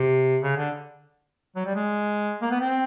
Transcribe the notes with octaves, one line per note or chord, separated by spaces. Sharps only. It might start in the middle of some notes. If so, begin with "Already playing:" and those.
Already playing: C3
C#3
D3
F#3
G3
G#3
A#3
B3
C4